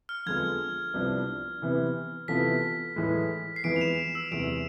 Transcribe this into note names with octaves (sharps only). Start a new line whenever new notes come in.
F6
F2 D3 G#3 B3 F4 G#6
C2 C3 F3 B3 D4
C3 E3 B3
C3 E3 B3 F4 A4 B6
A2 E3 G#3
C7
F2 E3 G#3 B3 D7
F7
E7
E6
E2 C3 E3 G#3 D7